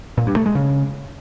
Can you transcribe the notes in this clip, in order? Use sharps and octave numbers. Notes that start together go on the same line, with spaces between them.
A#2
G2
A3
G#3
C#3